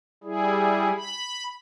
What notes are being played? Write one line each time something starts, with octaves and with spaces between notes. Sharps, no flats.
G3 E4 G#4
B5